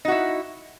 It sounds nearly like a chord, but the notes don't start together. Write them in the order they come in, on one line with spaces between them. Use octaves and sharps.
D#4 F#4 E4